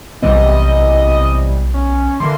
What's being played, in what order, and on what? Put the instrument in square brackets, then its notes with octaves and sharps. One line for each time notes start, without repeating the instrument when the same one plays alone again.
[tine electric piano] B1 B3 [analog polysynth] C3 E3 G3 [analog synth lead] D#5
[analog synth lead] C#4
[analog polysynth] D3 E3 A#3 [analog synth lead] C6